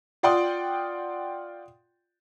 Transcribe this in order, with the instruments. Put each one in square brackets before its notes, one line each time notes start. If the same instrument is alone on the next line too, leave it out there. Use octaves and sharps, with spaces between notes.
[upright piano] F4 D5 F#5 G5 C6 D#6